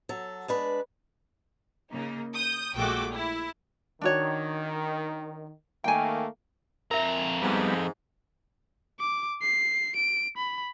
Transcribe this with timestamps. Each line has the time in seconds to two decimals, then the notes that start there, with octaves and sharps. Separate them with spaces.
0.09 F#3 A4
0.48 G#3 D4 B4
1.92 C#3 A#3 D#4
2.34 D#6 G6
2.76 A#1 G#3 A3 F#4 G5 D6
3.11 E4
4.01 D#3 D4 F#4 C#5
5.84 D#3 A3 A#3 G5 G#5
6.91 F2 A#4 E5 A#5
7.42 G#2 G3 B3
8.99 D6
9.42 C7
9.96 D7
10.37 B5